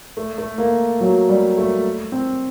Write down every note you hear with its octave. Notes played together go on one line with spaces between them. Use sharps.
A3
A3
A#3
F#3
G3
A3
C4